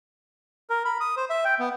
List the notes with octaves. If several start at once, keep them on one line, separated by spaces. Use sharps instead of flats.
A#4
B5
D#6
C5
E5
G5
B3